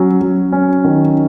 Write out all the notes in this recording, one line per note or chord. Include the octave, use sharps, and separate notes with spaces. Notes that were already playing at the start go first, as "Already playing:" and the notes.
Already playing: F#3 C#4
F#3
C#4
D#3